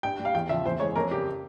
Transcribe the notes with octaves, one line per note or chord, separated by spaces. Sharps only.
G2 G5
G3
F5
E2 G5
C#3 F3 E5
E2 C5
E3 G#3 C#5
F2 A#4
C#3 G3 G4